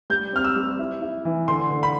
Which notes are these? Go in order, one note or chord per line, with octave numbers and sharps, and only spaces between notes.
G3 G6
C4 F6
E6
G3
E4
E4
E3
D3 C6
D3
B5